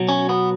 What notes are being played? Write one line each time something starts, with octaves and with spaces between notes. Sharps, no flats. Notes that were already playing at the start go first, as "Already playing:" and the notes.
Already playing: B2 F#3
C#4
B3